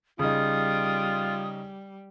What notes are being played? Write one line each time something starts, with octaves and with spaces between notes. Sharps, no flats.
C#3 G3 D#4 F4 D#6